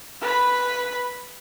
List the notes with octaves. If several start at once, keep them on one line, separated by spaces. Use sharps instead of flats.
B4 B5